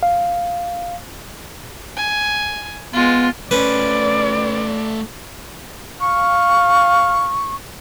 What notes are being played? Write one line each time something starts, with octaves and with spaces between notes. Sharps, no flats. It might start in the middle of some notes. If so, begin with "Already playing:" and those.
F5
G#5
G#3 B3 F4
A3 C#4 B4 C5 D5
F5 C#6